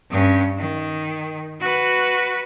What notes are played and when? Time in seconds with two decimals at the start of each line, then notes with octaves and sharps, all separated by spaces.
0.10 G2 C#4
0.58 D#3
1.60 F#4 B4